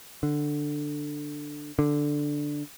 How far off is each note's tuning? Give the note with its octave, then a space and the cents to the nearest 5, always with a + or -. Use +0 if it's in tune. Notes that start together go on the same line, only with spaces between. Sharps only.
D3 +10
D3 +0